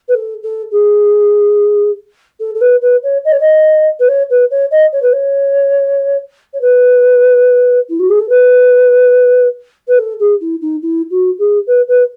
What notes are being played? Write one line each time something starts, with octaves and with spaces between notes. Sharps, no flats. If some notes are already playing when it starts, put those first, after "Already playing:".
B4
A4
A4
G#4
A4
A4
B4
B4
C#5
D#5
C#5
D#5
B4
C#5
B4
C#5
D#5
C#5
B4
C#5
C#5
B4
E4
F#4
G#4
A4
B4
B4
A4
G#4
E4
D#4
E4
F#4
G#4
B4
B4